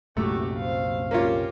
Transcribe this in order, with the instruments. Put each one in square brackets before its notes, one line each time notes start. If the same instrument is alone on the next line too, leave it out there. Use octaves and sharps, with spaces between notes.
[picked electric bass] C2 F#2 A#2 [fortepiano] A3 [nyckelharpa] F#4 G4
[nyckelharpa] C5 F5
[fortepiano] A#3 C#4 F4 [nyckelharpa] G4